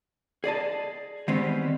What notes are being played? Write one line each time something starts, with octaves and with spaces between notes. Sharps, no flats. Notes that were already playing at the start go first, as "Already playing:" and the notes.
G#4 D5 D#5 A5
D#3 G3 G#3 B3 C4